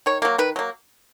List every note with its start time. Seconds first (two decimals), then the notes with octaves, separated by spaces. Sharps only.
0.06 D#3 C#5
0.22 F#3 A#3
0.38 D#3 B4
0.56 F#3 A#3